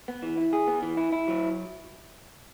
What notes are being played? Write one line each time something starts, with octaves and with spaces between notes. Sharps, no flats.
B3
E3
E4
G#4
B3
E3
E4
E4
F#3